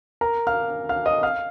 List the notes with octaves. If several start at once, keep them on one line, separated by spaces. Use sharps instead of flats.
A#4 A#5
F5 F6
F5 F6
D#5 D#6
F5 F6